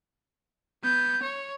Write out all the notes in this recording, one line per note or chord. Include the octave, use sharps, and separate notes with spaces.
B3 G6
C#5